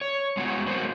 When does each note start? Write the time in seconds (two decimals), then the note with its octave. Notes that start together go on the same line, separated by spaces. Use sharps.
0.01 C#5
0.37 G#3 B3 F#4
0.67 F#3 G#3 A#3 F#4 C5